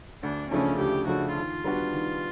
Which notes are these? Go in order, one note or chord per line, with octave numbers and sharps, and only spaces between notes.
D2 D4
C#3 F3 A3 C#4 D4
D2 G4
C#3 F3 A3 D4 F#4
D#3 F4
G3 B3 D4 F#4
D#3